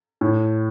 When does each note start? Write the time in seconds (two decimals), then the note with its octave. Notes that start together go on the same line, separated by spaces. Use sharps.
0.21 A2